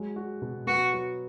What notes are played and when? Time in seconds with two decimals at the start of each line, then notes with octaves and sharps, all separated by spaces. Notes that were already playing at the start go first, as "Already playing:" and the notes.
Already playing: F#3 G#3
0.16 F#4
0.42 B2
0.67 B3 F#4
0.93 F#3